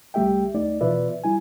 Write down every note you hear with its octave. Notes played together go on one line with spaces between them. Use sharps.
C2 G3 A3 G4 E5 G5
D#2 A3 D#4 D5
B2 E3 F4 B4 D5 E5
G3 E4 G#5